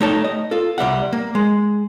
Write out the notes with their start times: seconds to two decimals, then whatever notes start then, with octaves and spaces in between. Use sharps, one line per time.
0.01 A3 D#4 G4 C#5 A5
0.24 D#5
0.51 F4 A4
0.78 C2 G3 E5 F#5
1.13 A#3
1.35 G#3